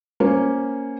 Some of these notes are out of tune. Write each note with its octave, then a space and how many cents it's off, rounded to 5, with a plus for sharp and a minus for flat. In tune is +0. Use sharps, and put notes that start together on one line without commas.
A#3 +0 C#4 +0 C5 +0